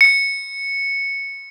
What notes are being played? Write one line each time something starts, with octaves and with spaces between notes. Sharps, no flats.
C#7